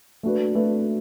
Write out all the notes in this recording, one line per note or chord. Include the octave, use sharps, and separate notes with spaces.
A3 D4 F#4 B4
A3 D4 F#4 B4